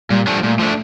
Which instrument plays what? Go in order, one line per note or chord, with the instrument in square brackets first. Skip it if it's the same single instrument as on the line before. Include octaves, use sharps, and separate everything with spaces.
[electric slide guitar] A#2 [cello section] G3
[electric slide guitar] F3 A3 D4
[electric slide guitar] A#2 [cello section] A3
[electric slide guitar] F3 A3 D4